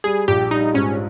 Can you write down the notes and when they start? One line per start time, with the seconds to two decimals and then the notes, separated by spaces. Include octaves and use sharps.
0.04 G3 G#4
0.28 A#1 G4
0.51 G3 D#4
0.74 G#2 C#4